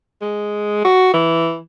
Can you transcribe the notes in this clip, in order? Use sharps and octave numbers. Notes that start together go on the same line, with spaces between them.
G#3
F#4
E3